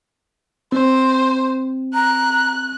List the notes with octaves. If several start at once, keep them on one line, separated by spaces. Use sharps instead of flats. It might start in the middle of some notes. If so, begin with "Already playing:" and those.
C4 C5
A#5 F#6